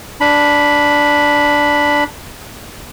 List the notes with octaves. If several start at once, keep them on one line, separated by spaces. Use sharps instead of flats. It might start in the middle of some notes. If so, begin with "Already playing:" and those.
D4 B5